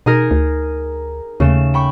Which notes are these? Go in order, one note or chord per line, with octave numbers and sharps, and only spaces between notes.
B2 D#4 G#4 A#4
D2
D#2 C#3 A3 E7
G5 B5 C#6